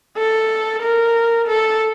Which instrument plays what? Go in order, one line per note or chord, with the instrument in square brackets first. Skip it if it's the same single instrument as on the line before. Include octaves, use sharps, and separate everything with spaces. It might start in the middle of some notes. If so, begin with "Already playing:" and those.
[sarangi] A4
A#4
A4